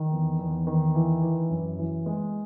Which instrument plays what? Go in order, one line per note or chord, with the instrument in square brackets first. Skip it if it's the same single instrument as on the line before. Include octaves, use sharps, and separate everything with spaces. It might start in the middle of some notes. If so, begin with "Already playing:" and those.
Already playing: [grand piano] D#3
E2
E2
D#3
E3
E3
F#2
E3
G#3